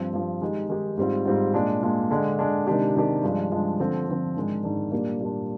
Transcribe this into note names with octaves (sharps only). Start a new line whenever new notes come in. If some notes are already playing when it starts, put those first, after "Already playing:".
Already playing: G2 F3 C4
G2 F3 C4
D#3 G#3 D#4 G4
D#3 G#3 D#4 G4
G#2 G3 C4 F4
G#2 G3 C4 F4
A#2 G#3 D4
A#2 G#3 D4
D3 G#3 D4
D3 G#3 D4
C3 D#3 G#3 D4 G4
C3 D#3 G#3 D4 G4
G2 F3 G#3 D4
G2 F3 G#3 D4
D3 F3 C4 F4
D3 F3 C4 F4
G#2 D#3 G#3 D4
G#2 D#3 G#3 D4
A#2 G3 A#3 D4
A#2 G3 A#3 D4